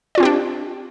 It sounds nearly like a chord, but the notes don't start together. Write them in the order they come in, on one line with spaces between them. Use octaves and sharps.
D5 F4 C4 G4 D4